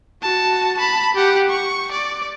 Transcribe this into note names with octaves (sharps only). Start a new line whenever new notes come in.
F#4 A5
A5 B5
G4 F#5
C#6
D5